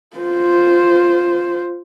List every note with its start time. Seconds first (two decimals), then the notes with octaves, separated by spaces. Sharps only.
0.16 F4 C5